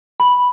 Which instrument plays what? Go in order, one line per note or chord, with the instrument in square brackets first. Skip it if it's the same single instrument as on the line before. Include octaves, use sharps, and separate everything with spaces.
[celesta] B5